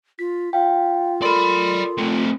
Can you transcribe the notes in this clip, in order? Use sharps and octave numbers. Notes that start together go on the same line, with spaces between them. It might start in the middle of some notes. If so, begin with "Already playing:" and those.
F4 B6
F4 F5 G5
A4 A#4 D5 B5 C6
A3 C4